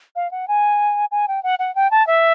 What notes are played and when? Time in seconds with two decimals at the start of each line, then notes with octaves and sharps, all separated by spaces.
0.16 F5
0.31 F#5
0.48 G#5
1.11 G#5
1.28 G5
1.43 F#5
1.59 F#5
1.75 G5
1.91 A5
2.07 E5